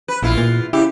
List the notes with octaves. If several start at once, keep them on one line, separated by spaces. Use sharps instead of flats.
B4
A#1 E2 E4 F4
A#2
C#3 E4 G4